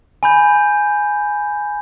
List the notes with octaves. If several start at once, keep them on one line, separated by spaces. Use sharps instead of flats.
G#5 B5 G6